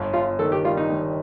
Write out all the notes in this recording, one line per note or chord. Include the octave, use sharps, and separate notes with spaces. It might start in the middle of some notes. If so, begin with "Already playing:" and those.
Already playing: G1
G1 F4
D#3 A4
G4
G3 F4
D#4
D#3